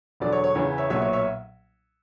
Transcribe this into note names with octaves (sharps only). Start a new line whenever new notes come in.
E1 E2 D3 F#3 D5
C#5
C#5
E2 C#3 E3 C#5
C#5 E5
B1 A#2 F#3 B3 C#5 E5
C#5
C#5 E5